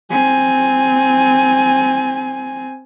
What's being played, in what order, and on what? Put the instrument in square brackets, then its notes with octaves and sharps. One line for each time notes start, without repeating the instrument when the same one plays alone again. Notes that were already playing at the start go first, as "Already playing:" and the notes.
[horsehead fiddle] C4 G#5